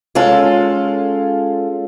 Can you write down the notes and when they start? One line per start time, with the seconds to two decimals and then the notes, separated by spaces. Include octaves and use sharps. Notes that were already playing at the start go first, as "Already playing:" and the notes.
0.15 G#3 C#4 F4 A4